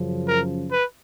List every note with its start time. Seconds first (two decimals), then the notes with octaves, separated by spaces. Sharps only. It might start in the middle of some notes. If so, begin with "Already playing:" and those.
Already playing: F#2 C#3 F3
0.27 A#4
0.69 B4